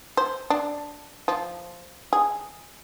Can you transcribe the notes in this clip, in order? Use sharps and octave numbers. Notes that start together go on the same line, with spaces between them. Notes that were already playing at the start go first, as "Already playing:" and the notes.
C5
D4
F3
G#4